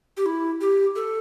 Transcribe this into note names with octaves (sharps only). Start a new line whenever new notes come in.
G4
E4
G4
A4